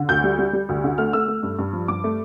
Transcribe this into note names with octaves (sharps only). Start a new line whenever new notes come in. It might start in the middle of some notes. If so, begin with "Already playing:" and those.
Already playing: D3
D2 G6
G3
G3
G3
D2
D3
A3 F6
A3 E6
A3
G2
G2
F3
G2 D6
A3